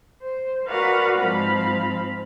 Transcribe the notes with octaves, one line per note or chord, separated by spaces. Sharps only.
C5
F#4 A#4 B4 D5 F5 F#5
G#2 F3 C4 F5 B5